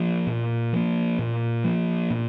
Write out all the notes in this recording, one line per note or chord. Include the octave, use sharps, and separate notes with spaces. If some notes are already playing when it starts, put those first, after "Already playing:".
Already playing: F3 A#3
A#2
F3 A#3
A#2
F3 A#3
A#2